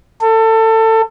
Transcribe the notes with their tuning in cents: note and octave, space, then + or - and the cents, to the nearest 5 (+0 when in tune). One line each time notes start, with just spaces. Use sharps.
A4 +25